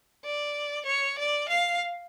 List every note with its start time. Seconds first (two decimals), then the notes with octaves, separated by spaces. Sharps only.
0.25 D5
0.86 C#5
1.18 D5
1.49 F5